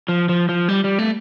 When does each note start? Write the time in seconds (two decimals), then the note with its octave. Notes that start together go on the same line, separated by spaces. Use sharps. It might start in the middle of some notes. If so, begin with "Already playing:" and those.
0.08 F3
0.29 F3
0.49 F3
0.69 G3
0.84 G3
0.99 A3